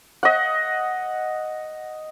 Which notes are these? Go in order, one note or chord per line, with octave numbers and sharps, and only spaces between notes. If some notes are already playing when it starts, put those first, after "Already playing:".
D#5 F#5